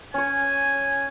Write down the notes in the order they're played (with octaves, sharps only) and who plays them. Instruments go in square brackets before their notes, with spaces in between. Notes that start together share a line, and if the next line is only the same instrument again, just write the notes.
[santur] C#4 C#5 [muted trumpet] G#5